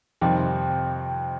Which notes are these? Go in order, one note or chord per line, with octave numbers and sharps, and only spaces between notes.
F2 C3 D#3 G3